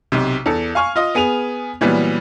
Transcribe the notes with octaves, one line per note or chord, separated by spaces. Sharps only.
B1 C3
E2 A4 C#7
F5 G#5 C#6 F6
F4 D#5 D#6
B3 G#4 D#7 F7
A#2 E3 F#3 G3 B3